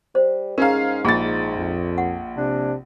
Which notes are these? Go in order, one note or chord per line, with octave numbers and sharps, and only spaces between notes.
G3 C5
G#2 C#4 G#4 A#4 F5 A#5
A#1 F4 G#4 A6
F2
F#5
C3 D4